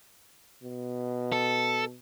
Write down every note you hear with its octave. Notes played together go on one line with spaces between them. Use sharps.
B2
A4